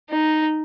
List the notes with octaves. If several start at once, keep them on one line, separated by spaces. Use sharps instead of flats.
D#4